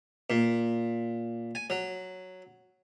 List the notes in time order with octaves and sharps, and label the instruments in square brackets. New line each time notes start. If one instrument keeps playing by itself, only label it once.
[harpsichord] A#2
G#5
F#3